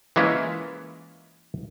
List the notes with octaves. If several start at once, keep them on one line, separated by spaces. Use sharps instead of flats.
E3 G#3 A#3 C#4 E4 F4